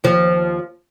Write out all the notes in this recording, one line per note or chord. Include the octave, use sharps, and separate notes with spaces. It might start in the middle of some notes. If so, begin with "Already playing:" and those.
D#2 F3